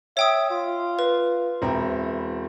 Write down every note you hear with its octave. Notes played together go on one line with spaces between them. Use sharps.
C#5 E5 G5 D#6
F4
B4
E1 C4 E4 A#5